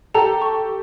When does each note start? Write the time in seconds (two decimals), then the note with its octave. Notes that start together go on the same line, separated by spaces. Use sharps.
0.14 G4 A4 A#5
0.42 C#6